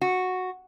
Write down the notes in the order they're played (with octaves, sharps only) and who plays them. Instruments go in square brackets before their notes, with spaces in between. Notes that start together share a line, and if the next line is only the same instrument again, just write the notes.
[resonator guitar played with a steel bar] F#4